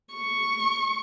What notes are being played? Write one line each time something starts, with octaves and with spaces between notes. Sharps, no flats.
C#6